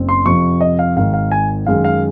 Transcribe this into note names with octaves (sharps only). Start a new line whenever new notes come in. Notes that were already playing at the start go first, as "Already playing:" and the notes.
Already playing: F#1 F#2 C4
C6
F2 C3 F3 C#6
D#5
F5
G#1 G#2 D#3 F5
F5
G#5
F#2 D#3 G#3 F5
F5